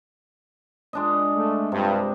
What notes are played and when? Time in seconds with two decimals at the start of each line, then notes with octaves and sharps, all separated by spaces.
0.93 G#3 D4 D#5
1.36 A3
1.72 G2 C3